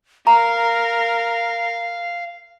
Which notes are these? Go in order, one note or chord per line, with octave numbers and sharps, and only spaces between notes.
A#4 F5 A#5